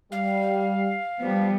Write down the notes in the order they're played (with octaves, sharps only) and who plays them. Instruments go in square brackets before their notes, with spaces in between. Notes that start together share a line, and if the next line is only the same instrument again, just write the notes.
[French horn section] G3 [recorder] F5
[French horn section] F3 [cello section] G3 B3